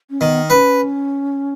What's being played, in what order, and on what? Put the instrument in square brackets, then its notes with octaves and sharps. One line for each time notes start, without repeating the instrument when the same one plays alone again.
[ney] C#4
[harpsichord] D#3 [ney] B3
[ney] C#4 [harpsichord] B4